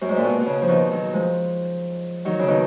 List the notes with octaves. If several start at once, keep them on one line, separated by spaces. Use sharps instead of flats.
F#2
G#2
A#2
B2
B2
C#3
F3
B2 D#3
D#3 F#3
F3 G#3
D#3 F#3
C#3
B2 D#3